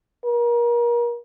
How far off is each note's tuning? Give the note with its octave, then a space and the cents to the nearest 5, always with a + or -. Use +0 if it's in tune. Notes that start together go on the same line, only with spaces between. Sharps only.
A#4 +35